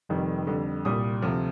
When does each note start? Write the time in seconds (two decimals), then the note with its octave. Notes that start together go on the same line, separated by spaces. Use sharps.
0.09 F1 F2 D#3 G3
0.47 F2 D3 G3
0.85 C2 A#2 G3 D#6
1.22 D2 C3 F3